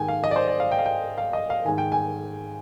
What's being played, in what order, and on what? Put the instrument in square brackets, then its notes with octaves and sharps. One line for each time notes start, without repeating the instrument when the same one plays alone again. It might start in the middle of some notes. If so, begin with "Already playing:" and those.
Already playing: [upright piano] G#2 D#3 G5 G#5
F5
D#5
D5
C5
D5
F5
G5
F5
G5
F5
D#5
F5
G#2 D#3 G#5
G5
G#5